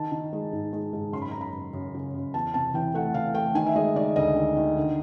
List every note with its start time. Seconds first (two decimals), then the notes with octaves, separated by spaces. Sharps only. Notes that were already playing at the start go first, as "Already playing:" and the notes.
Already playing: D#3 A5
0.12 D#3
0.33 G#3
0.53 G#2
0.73 G#3
0.93 G#2
1.13 F#2 C6
1.22 B5
1.31 F#2 A#5
1.41 B5
1.53 F#2
1.73 F#2
1.94 C#3
2.14 F#2
2.34 E2 A5
2.54 C3 A5
2.74 E3 G5
2.94 A3 F#5
3.14 E3 F5
3.35 A3 G5
3.55 D#3 G#5
3.66 E5
3.76 G#3 D#5
3.95 D#3 D5
4.16 D2 D#5
4.36 D#3
4.56 D#3
4.77 D3